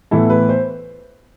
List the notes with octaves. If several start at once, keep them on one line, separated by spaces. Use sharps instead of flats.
A2 E3 B3 E4 A4
B4
C5